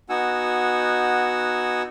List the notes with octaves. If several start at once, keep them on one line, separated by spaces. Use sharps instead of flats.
B3 D#4 F#4 F#5 G#5 E6